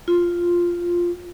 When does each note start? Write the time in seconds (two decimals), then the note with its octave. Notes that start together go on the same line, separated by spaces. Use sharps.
0.08 F4